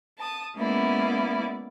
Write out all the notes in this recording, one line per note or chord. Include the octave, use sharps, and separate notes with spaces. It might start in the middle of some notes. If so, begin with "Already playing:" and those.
A5 D#6
G#3 A#3 B3 C#4 E4 D5